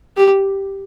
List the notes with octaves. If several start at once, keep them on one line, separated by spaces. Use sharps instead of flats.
G4